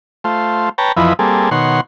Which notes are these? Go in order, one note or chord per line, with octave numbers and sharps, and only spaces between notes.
A3 F4 C5
B4 C#5 G5 A5 A#5
F2 E3 F3 E4 B4 D#5
G3 A#3 C4 G#4 A4
B2 D#3 C#5 F#5 C6